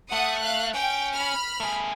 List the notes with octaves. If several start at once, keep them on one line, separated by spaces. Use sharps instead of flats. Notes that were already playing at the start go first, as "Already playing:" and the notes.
A3 F#5 D#6
F5 F#6
C#4 G5
B5 F6
A3 G#4